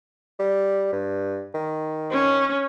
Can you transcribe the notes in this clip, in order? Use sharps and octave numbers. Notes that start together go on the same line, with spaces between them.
G3
G2
D#3
C#4